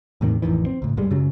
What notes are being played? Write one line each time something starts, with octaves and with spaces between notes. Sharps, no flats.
E2 A2 C3 D#3
A1 F2 D#3 E3
C4
C#2 A2
C2 G2 G3 G#3
C#2 F#2 C#3 F#3